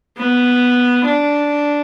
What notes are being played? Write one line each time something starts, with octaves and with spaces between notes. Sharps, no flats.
B3
D4